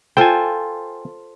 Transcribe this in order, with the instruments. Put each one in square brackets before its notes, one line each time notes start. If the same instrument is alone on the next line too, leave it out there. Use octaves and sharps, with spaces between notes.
[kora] F4 A4 C5 [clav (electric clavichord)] G5 G#5